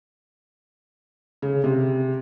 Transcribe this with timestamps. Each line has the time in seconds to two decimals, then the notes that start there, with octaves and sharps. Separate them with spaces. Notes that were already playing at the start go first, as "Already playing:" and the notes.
1.42 C#3
1.64 C3